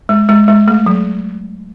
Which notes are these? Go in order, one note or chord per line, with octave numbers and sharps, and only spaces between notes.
G#3
G#3
G#3
A3
F#3